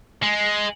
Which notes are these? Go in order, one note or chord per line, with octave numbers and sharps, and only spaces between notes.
G#3